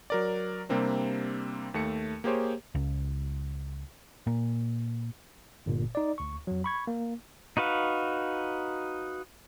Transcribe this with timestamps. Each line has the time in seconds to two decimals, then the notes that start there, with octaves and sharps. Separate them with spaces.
0.10 F#3 A#4 D5
0.69 C3 G3 A#3 C4 D4
1.74 D#2 A3 C#7
2.24 A#3 G4 G#4 C5 C#5
2.75 C#2
4.27 A#2
5.66 G1 A#2
5.95 D#4 D5
6.18 D2 C#6
6.47 F2 F#3
6.64 B5 C#6 G#6
6.87 A#3
7.57 D#4 F#4 B4 F5